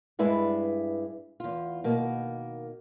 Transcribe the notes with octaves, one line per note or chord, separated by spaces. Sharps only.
G2 G#3 E4 B4 D5
E2 F4
B2 D#3 A#3